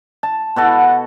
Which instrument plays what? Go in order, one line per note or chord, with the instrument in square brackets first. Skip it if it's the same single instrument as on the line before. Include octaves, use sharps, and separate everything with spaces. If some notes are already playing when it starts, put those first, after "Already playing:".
[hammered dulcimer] A5
[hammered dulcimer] B2 F#4 A4 [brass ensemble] F#5